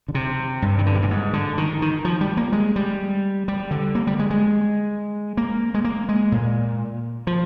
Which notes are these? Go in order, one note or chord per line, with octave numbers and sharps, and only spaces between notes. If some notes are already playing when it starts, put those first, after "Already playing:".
D3
C3
G2
D#3
D3
C3
A#2
G#2
D3
D#3
D#3
F3
G3
A#3
G#3
G3
G3
D3
A#3
G3
G#3
G#3
A#3
G#3
A#3
G#3
A#2
F3